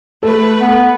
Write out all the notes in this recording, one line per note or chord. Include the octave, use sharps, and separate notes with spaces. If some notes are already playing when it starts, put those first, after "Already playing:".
A3 A4 B4
B3